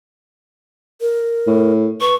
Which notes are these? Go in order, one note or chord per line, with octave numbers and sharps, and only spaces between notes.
A#4
A2
B4 C#6